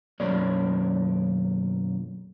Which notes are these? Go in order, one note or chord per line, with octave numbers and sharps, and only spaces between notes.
B1 F#2 A#3 C#5 D5